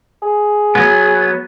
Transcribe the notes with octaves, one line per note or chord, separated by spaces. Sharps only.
G#4
F#3 B3